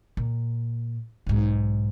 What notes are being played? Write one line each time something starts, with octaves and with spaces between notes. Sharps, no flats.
A#2
B1 G#2